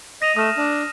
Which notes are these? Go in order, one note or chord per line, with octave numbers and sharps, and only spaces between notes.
D#5 A#6 D#7 F7
A3 D#6 F6 E7
D4